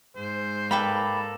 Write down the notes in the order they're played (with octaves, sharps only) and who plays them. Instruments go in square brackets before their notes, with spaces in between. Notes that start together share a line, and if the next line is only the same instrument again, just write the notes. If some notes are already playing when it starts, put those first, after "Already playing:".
[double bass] G#2 [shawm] C5
[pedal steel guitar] A#3 A4 [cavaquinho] B4 G5 B5 [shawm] D5